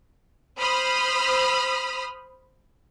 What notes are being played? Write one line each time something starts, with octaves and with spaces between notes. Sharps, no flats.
C5 B5 D#6 F6